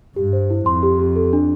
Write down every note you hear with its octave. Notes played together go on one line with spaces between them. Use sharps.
G2 G4
C5
E4
F2 C6
G4
G4
A4
D4